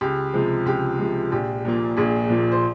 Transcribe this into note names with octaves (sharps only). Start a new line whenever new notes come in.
C#2 G4
C3 F3 G#3
C#2 G4
C3 F3 G#3
A#1 G4
A#2 F3 A#3
A#1 G#4
A#2 F3 A#3
C5